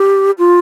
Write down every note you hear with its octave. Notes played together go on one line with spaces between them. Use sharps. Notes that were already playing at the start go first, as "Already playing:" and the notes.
Already playing: G4
F4